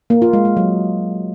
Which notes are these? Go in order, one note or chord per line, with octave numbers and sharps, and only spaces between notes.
A#3
F4
G#3
G#3
F#3